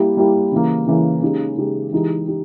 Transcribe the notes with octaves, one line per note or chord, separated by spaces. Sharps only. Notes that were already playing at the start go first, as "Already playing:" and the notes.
Already playing: G3 A#3 E4 G4
G3 A#3 E4 G4
C#3 E3 A#3
C#3 E3 A#3
C#3 G#3 D#4 G4
C#3 G#3 D#4 G4
E3 G#3 D#4 G4
D#4 G4